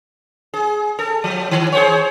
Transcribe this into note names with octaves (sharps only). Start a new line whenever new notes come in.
G#4
A4
F3
D#3
G#4 C5 C#5